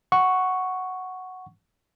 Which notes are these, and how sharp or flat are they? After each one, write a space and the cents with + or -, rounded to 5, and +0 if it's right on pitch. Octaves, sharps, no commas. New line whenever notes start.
F#5 +0 C#6 +0